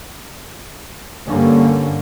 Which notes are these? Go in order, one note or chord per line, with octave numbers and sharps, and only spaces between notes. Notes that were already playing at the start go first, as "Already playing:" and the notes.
G2 D3 G3 A#3 C#4